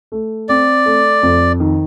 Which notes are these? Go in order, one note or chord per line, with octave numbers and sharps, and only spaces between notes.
A3
C4 D5
A3
F2
D#3